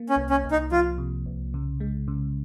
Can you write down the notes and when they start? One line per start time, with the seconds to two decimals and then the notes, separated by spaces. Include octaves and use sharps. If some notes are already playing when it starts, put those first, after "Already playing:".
Already playing: A#3
0.09 C#4
0.16 C2
0.30 C#4
0.44 C2
0.51 D#4
0.72 F3 F4
0.98 C3
1.26 C2
1.54 C#3
1.80 G#3
2.08 C#3